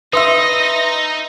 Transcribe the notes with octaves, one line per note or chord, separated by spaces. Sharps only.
D#4 B4 E5 C6 D#6 E6 A#6